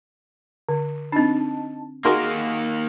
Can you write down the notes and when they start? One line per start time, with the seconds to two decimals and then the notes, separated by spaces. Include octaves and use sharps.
0.69 D3
1.12 C4 D4 D#4 A5
2.05 D#3 A#3 D#4 F#4 G#4 A#4 C6